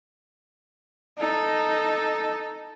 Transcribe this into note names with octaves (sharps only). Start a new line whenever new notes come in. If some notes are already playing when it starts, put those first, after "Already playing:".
D#4 A4